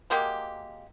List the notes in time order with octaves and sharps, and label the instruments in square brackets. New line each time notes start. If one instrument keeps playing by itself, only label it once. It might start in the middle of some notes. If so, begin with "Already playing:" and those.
[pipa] F#3 G#3 A#3 G4